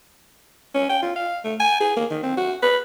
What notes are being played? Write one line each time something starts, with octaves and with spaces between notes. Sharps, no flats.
C#4
G5
F4
F5
A3
G#5
G#4
A#3
D#3
C4
F#4
B4